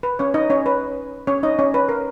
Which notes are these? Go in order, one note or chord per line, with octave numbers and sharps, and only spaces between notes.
B4
C#4 C#5
D#4 D#5
C#4 C#5
B4
C#4 C#5
D#4 D#5
C#4 C#5
B4
A#4